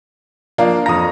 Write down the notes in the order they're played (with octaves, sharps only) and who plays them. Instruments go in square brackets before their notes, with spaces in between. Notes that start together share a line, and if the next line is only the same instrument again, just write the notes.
[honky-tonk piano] F3 A#3 F5 [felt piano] D4 A#4
[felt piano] F2 A#5 [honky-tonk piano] D#6 A#6